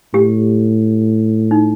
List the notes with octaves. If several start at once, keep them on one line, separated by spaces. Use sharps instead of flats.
A2 G4
D#4